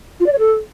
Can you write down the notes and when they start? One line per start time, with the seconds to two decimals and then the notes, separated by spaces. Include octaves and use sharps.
0.20 F4
0.26 D5
0.32 C#5
0.38 A4